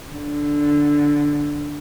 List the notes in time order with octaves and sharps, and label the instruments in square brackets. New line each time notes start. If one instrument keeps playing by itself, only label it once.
[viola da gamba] D3